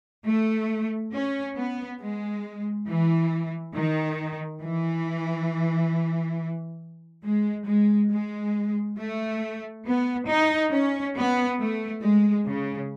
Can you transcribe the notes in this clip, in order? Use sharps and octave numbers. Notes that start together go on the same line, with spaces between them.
A3
C#4
B3
G#3
E3
D#3
E3
G#3
G#3
G#3
A3
B3
D#4
C#4
B3
A3
G#3
C#3